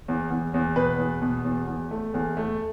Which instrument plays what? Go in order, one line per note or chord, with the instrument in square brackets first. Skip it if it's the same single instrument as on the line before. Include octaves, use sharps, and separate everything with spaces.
[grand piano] E2
E2
E2
B2 B4
E2
B2
E2
E2
A3
E2
A3